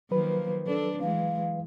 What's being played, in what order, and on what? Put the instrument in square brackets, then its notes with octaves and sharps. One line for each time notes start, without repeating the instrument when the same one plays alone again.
[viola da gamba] D#3 F3 A#3 [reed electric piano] F#3 B4
[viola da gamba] D4 [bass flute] A4
[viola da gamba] E3 G#3 [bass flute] F5